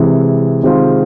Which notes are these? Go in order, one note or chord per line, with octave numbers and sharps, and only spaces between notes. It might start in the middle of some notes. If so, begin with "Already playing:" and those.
Already playing: C3 E3 G#3
C3 D#3 G#3 C4 F4